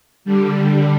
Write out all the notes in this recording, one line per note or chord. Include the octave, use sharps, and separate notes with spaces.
D3 G3